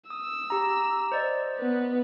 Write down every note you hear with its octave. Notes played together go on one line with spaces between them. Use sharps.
D#6 E6
G4 A#5
C5 D5 D#5
B3 B4